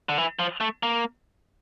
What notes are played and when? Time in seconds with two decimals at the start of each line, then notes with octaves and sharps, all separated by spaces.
0.09 D3
0.18 E3
0.39 F3
0.61 A3
0.83 A#3